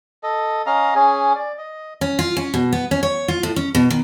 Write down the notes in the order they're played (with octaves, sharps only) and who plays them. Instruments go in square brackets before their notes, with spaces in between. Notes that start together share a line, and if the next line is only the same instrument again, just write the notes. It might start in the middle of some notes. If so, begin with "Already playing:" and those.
[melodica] A4 D#5
C#4 D#5 F5 A#5
C#4 G#4
D5
D#5
[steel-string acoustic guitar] C#4
F4
C#4
B2
B3
C#4
C#5
F4
A2
C#4
B2
D#3